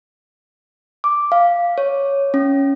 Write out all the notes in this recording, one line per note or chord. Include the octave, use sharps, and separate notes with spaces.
D6
F5
C#5
C#4